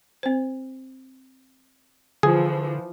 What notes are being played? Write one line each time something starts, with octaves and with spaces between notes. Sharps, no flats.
C4 C5
D3 E3 F3 G#4